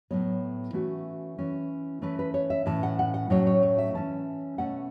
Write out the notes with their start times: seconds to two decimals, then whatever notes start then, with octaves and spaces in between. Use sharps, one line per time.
0.11 A2 F#3 B3 C#5
0.73 E3 A3 C#4 F#4
1.38 E3 C#4
2.02 E3 A3 C#4 B4
2.19 B4
2.34 C#5
2.50 E5
2.66 A2 E3 C#4 A5
2.83 F#5
2.99 F#5
3.14 F#5
3.30 A2 F#3 A3 C#4 C#5
3.47 C#5
3.63 C#5
3.78 E5
3.94 E3 C#4 A5
4.58 B2 A3 C#4 F#5